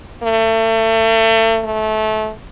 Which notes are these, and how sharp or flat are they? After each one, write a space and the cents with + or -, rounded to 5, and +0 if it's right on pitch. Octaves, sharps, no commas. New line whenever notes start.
A3 +35
A3 -25